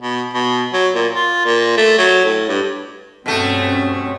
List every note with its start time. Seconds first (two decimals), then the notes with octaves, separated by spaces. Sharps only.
0.01 B2
0.33 B2
0.73 F#3
0.94 A#2
1.14 F4
1.45 A#2
1.77 A3
1.98 F#3
2.24 A2
2.49 G2
3.26 G2 B2 A3 C4 C#4